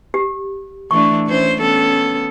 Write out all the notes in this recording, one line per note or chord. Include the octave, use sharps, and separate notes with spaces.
G4
E3 A3 D4 C#6
E3 C#4 C5
B3 C#4 A4